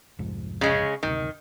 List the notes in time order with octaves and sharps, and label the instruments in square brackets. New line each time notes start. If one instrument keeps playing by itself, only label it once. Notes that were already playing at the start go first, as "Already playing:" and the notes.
[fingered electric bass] C2 F2 G#2
[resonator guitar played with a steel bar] C#3 G#3 C#4
[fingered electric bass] F#1 D2 C3 [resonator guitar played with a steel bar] D#3